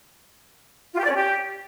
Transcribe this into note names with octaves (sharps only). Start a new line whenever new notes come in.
F4
G4
D5
C#4
G4